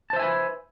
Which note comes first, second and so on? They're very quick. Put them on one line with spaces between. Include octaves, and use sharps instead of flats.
A5 C5 E5 G#5 B4